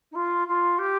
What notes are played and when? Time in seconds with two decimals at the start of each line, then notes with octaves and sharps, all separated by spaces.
0.11 D#4
0.15 F4
0.47 F4
0.78 G4